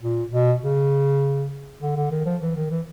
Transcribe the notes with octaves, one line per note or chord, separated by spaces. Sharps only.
A#2
B2
C#3
D3
D3
D#3
F3
E3
D#3
E3